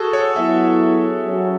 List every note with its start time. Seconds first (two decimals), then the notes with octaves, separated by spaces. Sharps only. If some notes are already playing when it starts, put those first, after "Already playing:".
Already playing: F#4 G#4 A4
0.13 C#5
0.36 F#3 B3 E4 E5
1.26 F#3 C#4